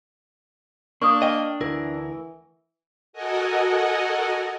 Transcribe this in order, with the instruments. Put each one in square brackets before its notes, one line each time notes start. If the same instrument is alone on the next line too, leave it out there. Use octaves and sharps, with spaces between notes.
[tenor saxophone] A#3 [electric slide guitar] D4 [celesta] C#6 D#6
[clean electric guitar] D#5 G5
[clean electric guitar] D2 E4 A#4 [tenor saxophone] E3
[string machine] F#4 A4 A#4 D#5 F#5 G#5